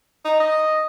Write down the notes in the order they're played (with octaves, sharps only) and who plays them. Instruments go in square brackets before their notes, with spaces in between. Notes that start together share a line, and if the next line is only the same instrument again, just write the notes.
[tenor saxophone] D#4
D#5